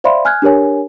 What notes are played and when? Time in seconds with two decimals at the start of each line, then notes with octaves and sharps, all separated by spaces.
0.04 C5 D5 E5 F5 B5 C6
0.25 G#5 F6 F#6 G#6
0.42 D4 G4 A#4 C#5 G#5